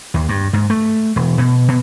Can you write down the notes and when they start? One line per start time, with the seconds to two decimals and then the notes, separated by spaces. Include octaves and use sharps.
0.14 D#2
0.29 G2
0.53 G#2
0.70 A3
1.16 E1
1.38 B2
1.68 B2